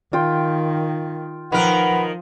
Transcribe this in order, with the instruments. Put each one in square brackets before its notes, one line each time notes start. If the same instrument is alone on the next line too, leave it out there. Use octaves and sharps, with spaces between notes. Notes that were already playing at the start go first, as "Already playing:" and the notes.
[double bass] D#3 [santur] F4 G5
[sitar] D#3 A#4 [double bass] F3 [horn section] B4 F#5